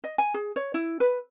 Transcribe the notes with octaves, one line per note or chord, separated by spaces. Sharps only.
D#5
G#5
G#4
C#5
E4
B4